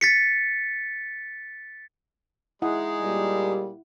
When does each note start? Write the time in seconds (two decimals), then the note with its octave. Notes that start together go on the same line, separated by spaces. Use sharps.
0.01 A6 B6 C#7
2.62 G#3 D#4 E4 G#4 F#5
3.02 A#2 G3